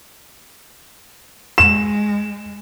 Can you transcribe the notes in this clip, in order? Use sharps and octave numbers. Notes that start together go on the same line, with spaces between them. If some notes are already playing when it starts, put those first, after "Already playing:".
G#3 E7